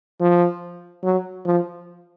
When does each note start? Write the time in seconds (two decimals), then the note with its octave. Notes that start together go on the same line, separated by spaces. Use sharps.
0.21 F3
1.04 F#3
1.46 F3